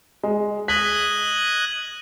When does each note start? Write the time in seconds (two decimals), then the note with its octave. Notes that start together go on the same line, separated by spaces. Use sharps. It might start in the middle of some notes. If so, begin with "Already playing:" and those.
0.23 G#3
0.68 D#5 F#6 G#6 B6